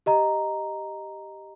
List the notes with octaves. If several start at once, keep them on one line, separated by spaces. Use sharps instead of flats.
G4 D#5 A#5